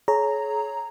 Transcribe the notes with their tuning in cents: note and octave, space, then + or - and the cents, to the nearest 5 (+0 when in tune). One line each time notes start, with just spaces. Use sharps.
G#4 +35 C#5 +0 A#5 -5